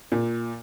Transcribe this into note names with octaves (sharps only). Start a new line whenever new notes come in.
A#2